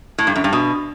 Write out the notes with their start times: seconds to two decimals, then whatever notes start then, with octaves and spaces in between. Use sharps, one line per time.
0.18 A2
0.27 G2
0.36 F#2
0.44 G2
0.53 B2